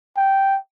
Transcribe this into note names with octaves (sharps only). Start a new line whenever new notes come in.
G5